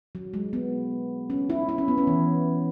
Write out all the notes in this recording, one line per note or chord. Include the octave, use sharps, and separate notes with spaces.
F#3
G#3
B3
C#4
E4
E4
C#4
B3
C#4
E3